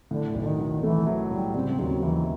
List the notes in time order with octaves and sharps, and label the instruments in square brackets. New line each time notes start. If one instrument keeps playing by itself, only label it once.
[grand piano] A2 [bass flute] D3
[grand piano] B1 [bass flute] D3
[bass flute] D#3
[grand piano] F#3
[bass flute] E3 [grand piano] A3
[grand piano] F#3
[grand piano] A2 [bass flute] G3
[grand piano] C#3 [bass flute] C4
[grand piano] D#2 [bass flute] F#3
[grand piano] D#2 [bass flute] E3